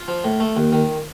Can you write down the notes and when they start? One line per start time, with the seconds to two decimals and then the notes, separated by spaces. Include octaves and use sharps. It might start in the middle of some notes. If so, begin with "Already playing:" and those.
Already playing: F4
0.08 F3
0.24 A2
0.40 A3
0.57 D#2
0.73 D#3